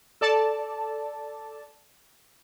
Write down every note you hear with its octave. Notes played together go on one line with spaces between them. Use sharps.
A4 D5 A5